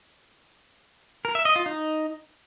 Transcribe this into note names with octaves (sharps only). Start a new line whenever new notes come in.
A#4
E5
D#5
F4
D#4